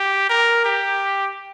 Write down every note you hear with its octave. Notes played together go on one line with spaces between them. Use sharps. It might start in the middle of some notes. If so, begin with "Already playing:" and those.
Already playing: G4
A#4
G4